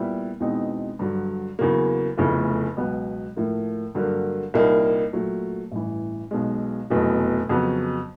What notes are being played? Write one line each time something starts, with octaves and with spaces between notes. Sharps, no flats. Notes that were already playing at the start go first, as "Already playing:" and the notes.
Already playing: A#2 G3 B3 E4
E2 B2 G#3 C4 D#4
G2 D3 F#3
E2 C#3 F#3 A#3
F1 E2 C#3 F3 A3
C#2 B2 F#3 B3
A2 F3 A#3
G2 D3 F#3 A#3
C2 A#2 G3 A#3 D#4
A#2 F#3 A3
A1 G2 E3
B1 B2 G#3
F1 E2 B2 F#3
F2 C#3 F#3 B3